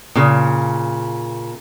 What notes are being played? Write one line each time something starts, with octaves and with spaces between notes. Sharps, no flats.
A#2 C#3